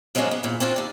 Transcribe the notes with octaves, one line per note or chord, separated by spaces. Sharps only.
F3 F#3 G#3 A#3 C#4 D4
B3
E2 A#2
C4 D4 F4 F#4
D#2 D5